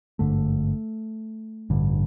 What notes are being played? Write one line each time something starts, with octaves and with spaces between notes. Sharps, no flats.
G#1 G2 D3 A3
A1 G2 D3